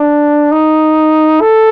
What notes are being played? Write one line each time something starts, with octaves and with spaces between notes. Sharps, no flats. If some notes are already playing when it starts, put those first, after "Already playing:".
Already playing: D4
D#4
A4